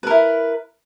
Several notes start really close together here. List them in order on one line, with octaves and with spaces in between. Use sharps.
B4 A#4 E4